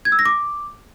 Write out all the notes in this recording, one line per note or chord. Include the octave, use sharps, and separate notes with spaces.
G#6
E6
A#6
D6